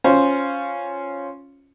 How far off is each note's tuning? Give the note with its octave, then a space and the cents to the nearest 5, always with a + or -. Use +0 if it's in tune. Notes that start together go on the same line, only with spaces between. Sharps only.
C#4 +0 F4 +0 C5 +0